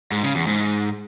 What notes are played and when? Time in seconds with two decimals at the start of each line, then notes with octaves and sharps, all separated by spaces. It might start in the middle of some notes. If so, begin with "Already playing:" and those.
0.12 G#2
0.23 C#3
0.35 E2
0.47 G#2